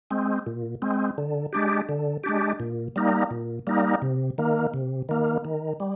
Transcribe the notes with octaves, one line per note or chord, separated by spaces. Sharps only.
G#3 C4
A#2
G#3 C4
D3
G#3 D4 G4
D3
G#3 D4 G4
A#2
G3 A#3 D#4
A#2
G3 A#3 D#4
C3
D#3 A#3
C3
D#3 A#3
D#3
G3